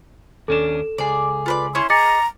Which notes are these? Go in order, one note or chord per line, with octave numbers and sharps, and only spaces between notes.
D#2 C#4 D4 A4 E7
C#2 G#4 D5
F4 B4 D5
C#4 E4 C6 C#6
G#4 D#5 A#5 D6 A6 C#7